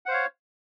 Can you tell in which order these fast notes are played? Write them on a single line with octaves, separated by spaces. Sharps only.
F#5 C5 F5 C#5